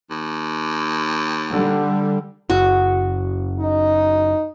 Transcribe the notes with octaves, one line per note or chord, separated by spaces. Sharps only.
D#2
D3 G3
F#1 F#4
D#4